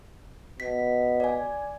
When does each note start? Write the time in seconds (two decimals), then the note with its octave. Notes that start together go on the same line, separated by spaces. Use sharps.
0.60 B2 B6
1.20 D5 G#5